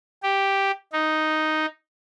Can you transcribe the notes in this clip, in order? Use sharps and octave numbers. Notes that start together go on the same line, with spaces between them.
G4
D#4